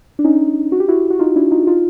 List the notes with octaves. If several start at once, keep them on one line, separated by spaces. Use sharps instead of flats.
D4
C#4 D#4
F#4
G4
E4 F#4
F#4
D#4 F4
D4 E4
D#4 F4
D#4 F4